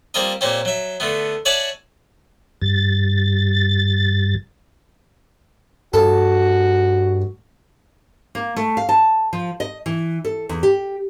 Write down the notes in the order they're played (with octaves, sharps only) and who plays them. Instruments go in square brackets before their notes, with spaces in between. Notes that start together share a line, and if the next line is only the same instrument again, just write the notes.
[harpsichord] G3 A#3 C4 F4 A#4 D#5
A#2 A#3 C4 C#4 G4
F#3 E5
D3 A3 B3
C#5 D5 E5 F#5 G#5 A5
[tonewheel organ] G2 A6
[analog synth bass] G2 [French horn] F#4 [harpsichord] A4
[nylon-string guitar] A#3
A3
F5
A5
F3
D#5
E3
A4
E2
G4